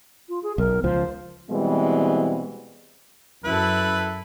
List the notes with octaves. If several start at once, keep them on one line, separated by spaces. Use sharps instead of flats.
F4
G#4
B1 A#4
C#2 F3 C5
B2 E3 G3 G#3 C4
F#2 E4 A4 B4